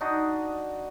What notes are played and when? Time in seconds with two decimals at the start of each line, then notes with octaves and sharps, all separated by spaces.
0.01 D4 D#4 F#4 D#5